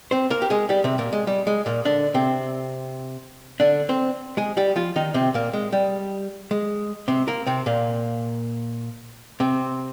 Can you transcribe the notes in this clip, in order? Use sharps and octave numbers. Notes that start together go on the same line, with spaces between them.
C4 C5
A#3 A#4
G4
G#3 G#4
G3 G4
C3 C4
A#2 A#3
G#3
G3
G#3
A#2 A#3
D3 D4
C3 C4
D3 D4
C4 C5
G#3 G#4
G3 G4
F3 F4
D#3 D#4
C3 C4
A#2 A#3
G#3
G3
G#3
C3 C4
A#3 A#4
C3 C4
A#2 A#3
C3 C4